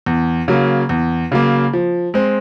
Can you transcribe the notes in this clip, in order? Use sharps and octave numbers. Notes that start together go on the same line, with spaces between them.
E2
C#3 F#3 A#3
E2
C#3 F#3 A#3
F3
G#3 C4